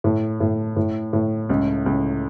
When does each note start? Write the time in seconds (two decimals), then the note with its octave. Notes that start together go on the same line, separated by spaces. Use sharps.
0.04 A2
0.40 A2
0.76 A2
1.13 A2
1.50 C#2
1.86 C#2